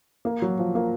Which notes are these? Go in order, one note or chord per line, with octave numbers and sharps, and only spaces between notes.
A#3
F#3
F3
A#3